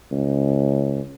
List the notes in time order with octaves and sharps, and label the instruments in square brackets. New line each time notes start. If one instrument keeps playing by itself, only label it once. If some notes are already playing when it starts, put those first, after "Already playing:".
[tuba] C#2